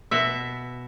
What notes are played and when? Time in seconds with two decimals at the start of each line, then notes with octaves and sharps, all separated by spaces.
0.11 B2 E5